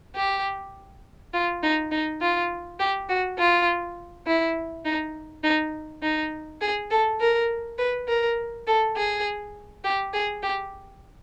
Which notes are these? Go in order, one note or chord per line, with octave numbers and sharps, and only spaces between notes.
G4
F4
D#4
D#4
F4
G4
F#4
F4
E4
D#4
D#4
D#4
G#4
A4
A#4
B4
A#4
A4
G#4
G4
G#4
G4